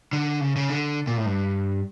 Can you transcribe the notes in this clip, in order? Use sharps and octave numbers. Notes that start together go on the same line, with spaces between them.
D3
C#3
C#3
D3
A#2
A2
G2